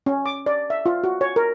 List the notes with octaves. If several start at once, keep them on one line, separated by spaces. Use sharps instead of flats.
C#4
D6
D5
E5
F4
F#4
C#5
A#4